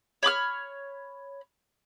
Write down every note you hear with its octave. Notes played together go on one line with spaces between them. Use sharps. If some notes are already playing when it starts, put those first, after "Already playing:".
C#5 B5 D6 F6